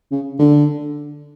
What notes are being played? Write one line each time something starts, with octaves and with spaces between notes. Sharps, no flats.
C#3
D3